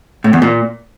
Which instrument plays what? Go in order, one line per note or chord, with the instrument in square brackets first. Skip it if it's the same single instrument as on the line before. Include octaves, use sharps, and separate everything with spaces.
[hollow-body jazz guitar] A2
E2
A#2